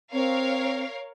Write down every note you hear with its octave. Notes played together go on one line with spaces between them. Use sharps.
C4 A#4 C#5 F5